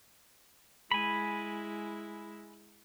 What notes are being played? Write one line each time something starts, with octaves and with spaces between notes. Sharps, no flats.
G#3 E4 G#5 B5